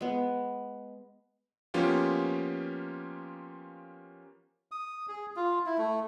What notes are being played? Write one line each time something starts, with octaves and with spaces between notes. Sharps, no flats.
G#3 B3
F3 A#3 B3 C#4 F4 G4
D#6
G#4
F4
E4
A3